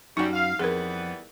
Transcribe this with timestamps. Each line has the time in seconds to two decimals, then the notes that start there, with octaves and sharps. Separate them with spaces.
0.17 F#2 G3 D#4 F#4
0.33 F5
0.59 F2 E3 G3 B3 G#4 A#4